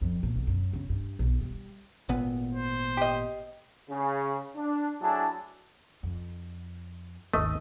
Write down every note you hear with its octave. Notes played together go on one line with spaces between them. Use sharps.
F2
A#2
B1
F#2
C#3
G2
B1
G3
G#1 A#2 B3
C5
G4 D#5
C#3
D4
A2 F#3 D4 E4 G#4 A5
F2
G#1 D#2 A3 D#5